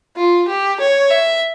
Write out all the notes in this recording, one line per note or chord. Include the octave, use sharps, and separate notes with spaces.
F4
G4
C#5
E5